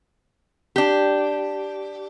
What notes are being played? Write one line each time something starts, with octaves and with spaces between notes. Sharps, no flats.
D4 G4